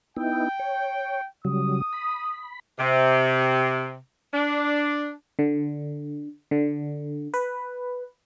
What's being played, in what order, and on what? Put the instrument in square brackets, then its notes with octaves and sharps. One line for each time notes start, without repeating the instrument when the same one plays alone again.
[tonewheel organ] B3 D#4 E4 [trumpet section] G5
[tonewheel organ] C#5
[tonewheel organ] C#3 F#3 G3 [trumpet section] D#6
[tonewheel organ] B5
[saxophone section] C3
D4
[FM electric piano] D3
D3
B4